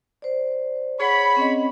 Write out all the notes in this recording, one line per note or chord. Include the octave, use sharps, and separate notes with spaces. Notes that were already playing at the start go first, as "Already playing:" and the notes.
C5 D5
G#4 C#5 F#5 B5
C4 C#4 D#5